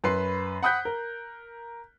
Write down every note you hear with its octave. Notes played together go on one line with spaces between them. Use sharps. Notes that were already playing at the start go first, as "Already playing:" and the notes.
F#2 B4 B5 C6 C7
F#5 B5 D#6 F#6 G6 B6
A#4